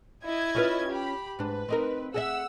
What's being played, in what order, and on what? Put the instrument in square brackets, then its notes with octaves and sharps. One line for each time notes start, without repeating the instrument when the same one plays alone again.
[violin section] E4 D#5 G#6
[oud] C#4 F4 B4
[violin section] G4 B5
[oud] G#2 D4 [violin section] B4
[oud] C4 D#4 A#4
[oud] G#4 D#5 E5 [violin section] F#5 E6